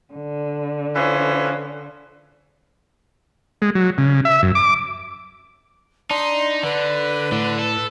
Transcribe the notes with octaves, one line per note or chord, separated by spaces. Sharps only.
D3
E3 F3 C#4
G#3
F#3
C#3
E5
F#2
D6
D4 D#4 C6
D3 B4
A2 D3
A4